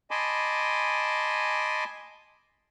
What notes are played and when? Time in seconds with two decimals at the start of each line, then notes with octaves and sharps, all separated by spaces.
0.11 D#5 G#5 A5 B5 C6 D6